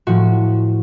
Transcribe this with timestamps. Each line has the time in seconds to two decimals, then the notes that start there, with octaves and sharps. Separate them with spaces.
0.07 A2 F3 F#4